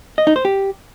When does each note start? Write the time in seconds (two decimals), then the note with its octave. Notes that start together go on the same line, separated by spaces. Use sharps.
0.18 D#5
0.27 D#4
0.36 C5
0.45 G4